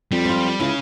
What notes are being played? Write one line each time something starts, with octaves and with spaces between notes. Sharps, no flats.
F2 G3
C4 F4
C#2 C#4 E4 F5